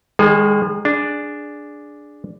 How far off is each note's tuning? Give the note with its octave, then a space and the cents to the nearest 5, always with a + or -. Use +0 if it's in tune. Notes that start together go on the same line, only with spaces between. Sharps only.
D#3 +0 G#3 -35 G#4 +25
D4 +0 G#4 +0